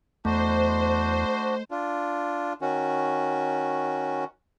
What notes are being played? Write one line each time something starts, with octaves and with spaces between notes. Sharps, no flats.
E2 A3 D4 F#4 C5
D4 F4
D#3 C#4 F#4